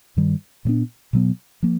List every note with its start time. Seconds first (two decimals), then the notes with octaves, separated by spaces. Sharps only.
0.17 G2 D#3 G3
0.65 A#2 F#3 B3 D4
1.13 B2 F#3 B3
1.63 F3 A#3